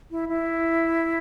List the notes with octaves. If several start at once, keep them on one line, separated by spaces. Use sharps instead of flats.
E4
E4